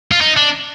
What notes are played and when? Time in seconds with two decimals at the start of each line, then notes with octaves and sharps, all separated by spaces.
0.12 F4
0.21 D#4
0.36 D4